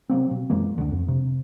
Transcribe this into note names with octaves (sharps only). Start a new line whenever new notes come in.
C3 F#3 A#3 C4
B2
F#2 E3 G#3 A#3
D2 D3
F2
C3